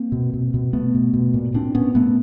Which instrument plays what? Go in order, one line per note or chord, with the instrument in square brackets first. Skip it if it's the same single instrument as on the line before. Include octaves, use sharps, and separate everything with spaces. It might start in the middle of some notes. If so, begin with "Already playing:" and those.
Already playing: [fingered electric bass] A#3 C4
B2
B2
B2
B2 A3 B3
B2
B2
A#2
A#2 C4 D4
A#2 B3 C#4
A#2 A3 B3